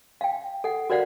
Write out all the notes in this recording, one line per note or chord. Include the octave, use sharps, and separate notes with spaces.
F5 G5
A4 F#5
F#4 A#4 C5 D5 F5 F#5